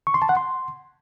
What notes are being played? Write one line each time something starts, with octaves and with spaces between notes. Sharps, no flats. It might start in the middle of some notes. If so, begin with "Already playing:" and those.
C#6
C6
A5
F#5
C6